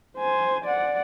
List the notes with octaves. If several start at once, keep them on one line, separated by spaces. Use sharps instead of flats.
C5 G#5
D5 F#5